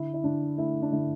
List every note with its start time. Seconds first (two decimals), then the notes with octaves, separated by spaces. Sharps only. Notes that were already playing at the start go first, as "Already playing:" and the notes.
Already playing: D3 E4
0.14 E4
0.24 D3 D4
0.58 A3 E4
0.82 D4
0.92 D3 E4